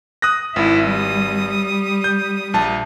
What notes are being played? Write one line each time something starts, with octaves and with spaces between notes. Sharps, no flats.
D#6 F#6 A#6
G#1 E4
G3 D#6
G6
A#1 A5